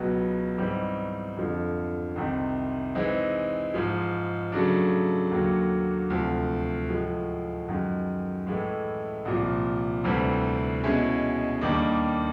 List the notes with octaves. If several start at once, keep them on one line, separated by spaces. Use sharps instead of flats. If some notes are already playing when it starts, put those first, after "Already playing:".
Already playing: C#2 B2 F#3 B3
G#2 E3 G3 C4 D#4
F2 D3 F3
C2 C3 D#3
E3 G#3 C4 D#4
G#2 F3 G#3
C#3 F#3 A3 D4
D#2 D3 F#3 A#3
D2 C3 F3
A2 F3 G#3
F#2 D#3 G#3
A2 E3 G#3
C2 A#2 F3
D2 C3 E3 G3 C4
B2 G#3 C#4 E4 G#4
D#2 D#3 G3 A#3 D4